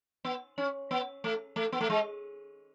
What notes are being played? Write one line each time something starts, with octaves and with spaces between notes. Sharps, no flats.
B3
C#4
B3
A3
A3
B3
A3
G#3